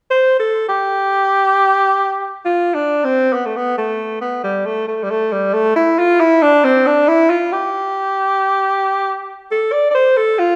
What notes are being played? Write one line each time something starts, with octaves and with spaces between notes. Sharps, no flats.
C5
A4
G4
F4
D4
C4
B3
A3
B3
A3
B3
G3
A3
A3
G3
A3
G3
A3
E4
F4
E4
D4
C4
D4
E4
F4
G4
A4
D5
D5
C5
A4
F4